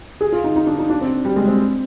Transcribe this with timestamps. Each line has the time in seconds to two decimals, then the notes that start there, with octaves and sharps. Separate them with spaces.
0.21 G#4
0.32 F4
0.44 D#4
0.56 D#4
0.67 D4
0.79 D#4
0.90 D4
1.01 C4
1.25 G3
1.36 G#3
1.48 C4